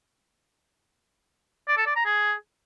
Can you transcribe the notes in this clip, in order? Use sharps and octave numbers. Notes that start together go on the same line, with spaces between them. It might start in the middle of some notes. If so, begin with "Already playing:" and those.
D5
A4
D5
A#5
G#4